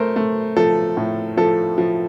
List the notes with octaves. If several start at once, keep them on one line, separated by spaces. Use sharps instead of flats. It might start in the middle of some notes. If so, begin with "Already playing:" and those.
Already playing: A3 A#4 C5
A3
F3 A4
A2
F3 A4
F3